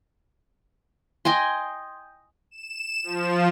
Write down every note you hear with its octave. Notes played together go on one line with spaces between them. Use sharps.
D#5 G5 G#5 C6
E7
F3